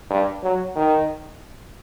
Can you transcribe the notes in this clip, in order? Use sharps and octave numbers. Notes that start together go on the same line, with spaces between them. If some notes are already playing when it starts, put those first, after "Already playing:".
G2
F#3
D#3